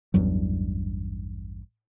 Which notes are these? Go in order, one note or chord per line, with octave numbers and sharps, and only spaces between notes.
A1 E2 G2 F#3